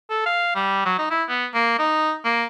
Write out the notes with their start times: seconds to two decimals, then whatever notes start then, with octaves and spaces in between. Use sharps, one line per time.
0.10 A4
0.26 F5
0.55 G3
0.86 F#3
0.98 D#4
1.10 E4
1.29 B3
1.54 A#3
1.79 D#4
2.25 A#3